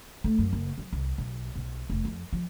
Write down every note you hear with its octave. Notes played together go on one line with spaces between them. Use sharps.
A3
F#2
F#1
F#3
C2
B1
B1
F1
F2
F3